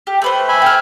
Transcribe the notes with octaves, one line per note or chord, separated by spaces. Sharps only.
G4
A3 B4 C5
E5 G#5 B5
G5 F6